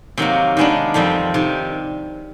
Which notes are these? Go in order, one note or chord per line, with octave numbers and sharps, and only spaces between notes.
C3 D#3 F#3 A#3
D#3 G#3 B3 D4
F2 C3 D#3 G3 C4
C3 D#3